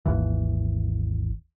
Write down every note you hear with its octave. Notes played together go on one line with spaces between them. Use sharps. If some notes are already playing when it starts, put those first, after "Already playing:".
G#1 D#2 E3